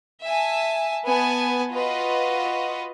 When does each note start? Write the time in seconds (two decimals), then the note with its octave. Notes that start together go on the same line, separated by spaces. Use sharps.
0.23 E5 G#5 A5
1.05 B3 B4 G#5 A5
1.72 F4 F#4 B4 D#5